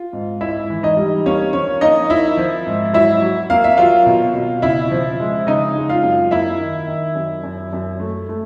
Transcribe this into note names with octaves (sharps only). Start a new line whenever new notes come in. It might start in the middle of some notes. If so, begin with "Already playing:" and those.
Already playing: F4
G#2
G#2 E4 E5
E3
D#4 D#5
G3
A#3 C#4 C#5
F3 C#4 C#5
A#3 D#4 D#5
A#3 E4 E5
F3
G#2
F#3 E4 E5
F#3
A#3 F5
E5
F#3 F4 F5
B2
B2
C#3 E4 E5
F3
G#3
C#3 D#4 D#5
G#3
F4 F5
F#2
A#3 E4 E5
D#3
D#3
F#2
F#2
F#2
A3
A3